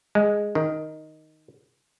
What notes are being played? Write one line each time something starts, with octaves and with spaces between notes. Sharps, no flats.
G#3
D#3